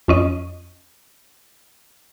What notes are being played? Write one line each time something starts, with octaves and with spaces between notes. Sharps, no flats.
F2 C#4 D#5